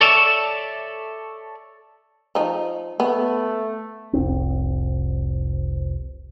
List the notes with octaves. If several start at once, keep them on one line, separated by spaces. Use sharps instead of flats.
A4 C#5 D5 E5 A5
F3 D#4
A3 B3
F1 C2 C4